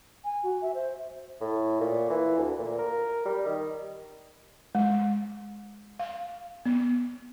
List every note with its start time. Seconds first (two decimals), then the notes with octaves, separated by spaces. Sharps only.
0.24 G#5
0.43 F#4
0.62 E5
0.74 C5
1.41 A2
1.80 A#2
2.10 E3
2.38 D2
2.59 A#2
2.78 A#4
3.25 G3
3.46 D#3
4.75 G#3
6.00 F5
6.66 B3